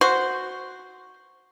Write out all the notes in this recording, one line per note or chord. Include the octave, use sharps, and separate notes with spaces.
F#4 C5